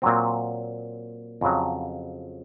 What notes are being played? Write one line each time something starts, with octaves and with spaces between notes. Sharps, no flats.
A#2 F#3 C4
F2 C#3 F#3